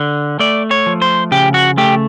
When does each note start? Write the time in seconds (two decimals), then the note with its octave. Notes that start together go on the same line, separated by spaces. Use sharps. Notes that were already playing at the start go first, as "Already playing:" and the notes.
Already playing: D3
0.39 A3 D5
0.71 C#5
0.86 F3
1.02 C5
1.32 C#3 G4
1.54 F#4
1.78 A3 G4